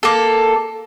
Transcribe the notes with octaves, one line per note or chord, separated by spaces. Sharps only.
A#3 A4